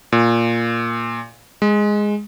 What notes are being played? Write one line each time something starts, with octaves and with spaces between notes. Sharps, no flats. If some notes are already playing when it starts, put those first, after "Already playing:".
A#2
G#3